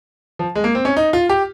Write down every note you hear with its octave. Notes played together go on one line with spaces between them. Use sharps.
F3
G#3
A#3
C4
C#4
D#4
F4
G4